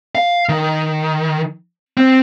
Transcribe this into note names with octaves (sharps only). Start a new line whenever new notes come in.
F5
D#3
C4